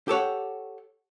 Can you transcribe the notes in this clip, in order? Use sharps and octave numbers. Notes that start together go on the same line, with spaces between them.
G4 A4 C#5 F#5